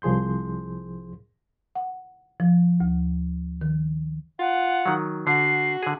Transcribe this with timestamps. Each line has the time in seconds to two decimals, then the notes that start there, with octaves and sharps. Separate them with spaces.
0.02 C2 F3 G#4 C6 G6
1.75 F#5
2.40 F3
2.80 D2
3.61 D#3
4.39 F4 F#5
4.85 D#3 F#3
5.27 D3 F#4 C7
5.83 D3 G#4